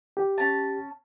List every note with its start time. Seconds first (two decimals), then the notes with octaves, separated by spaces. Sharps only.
0.17 G4
0.38 C#4 A5